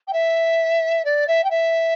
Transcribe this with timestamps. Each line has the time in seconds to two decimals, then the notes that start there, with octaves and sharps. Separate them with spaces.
0.07 G5
0.12 E5
1.04 D5
1.27 E5
1.43 G5
1.50 E5